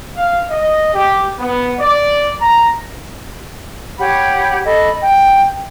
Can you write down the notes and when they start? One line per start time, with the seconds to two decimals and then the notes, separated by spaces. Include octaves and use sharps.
0.15 F5
0.49 D#5
0.93 G4
1.38 B3
1.78 D5
2.40 A#5
3.99 G4 C#5 F#5 B5
4.66 A4 D#5 B5
5.02 G5